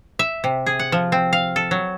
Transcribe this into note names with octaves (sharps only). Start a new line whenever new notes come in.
E5
C3
G#4
F#5
F3
C4
F5
A4
F#3